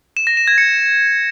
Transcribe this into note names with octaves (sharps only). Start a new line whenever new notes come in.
E7
A#6
E7
G#6
C#7